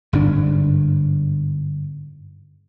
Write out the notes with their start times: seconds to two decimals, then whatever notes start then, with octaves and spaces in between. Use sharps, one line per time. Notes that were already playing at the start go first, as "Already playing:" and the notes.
0.13 G1 G#2 D4